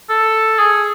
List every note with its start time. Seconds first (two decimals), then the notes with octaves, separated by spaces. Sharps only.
0.09 A4
0.59 G#4